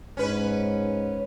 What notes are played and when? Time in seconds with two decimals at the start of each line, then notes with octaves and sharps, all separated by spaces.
0.17 G#2 C#4 B4